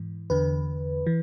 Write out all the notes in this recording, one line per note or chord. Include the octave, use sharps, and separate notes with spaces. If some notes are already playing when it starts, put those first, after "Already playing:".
Already playing: G#2 E3
E2 D3 B4
E3